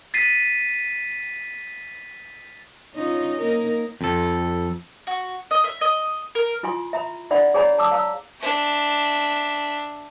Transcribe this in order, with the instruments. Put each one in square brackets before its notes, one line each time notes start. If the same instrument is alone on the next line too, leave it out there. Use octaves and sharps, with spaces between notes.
[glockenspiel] A6 B6 C7 D#7
[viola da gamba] C#4 D#4 F4
A#3 D#4 A#4
[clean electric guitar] F2 A4
[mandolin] F#4
D#5
E5
D#5
A#4
[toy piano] E4 F4 G#5 C6
E5 A#5 B5
D4 E4 D5 E5 F#5 B5
G#4 C#5 D5 G#5 A#5 B5
A5 D6 E6
F5 A#5 E6
[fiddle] D4 E5